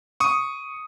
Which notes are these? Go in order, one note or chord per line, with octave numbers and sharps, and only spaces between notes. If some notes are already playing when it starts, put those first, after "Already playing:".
C#6 D#6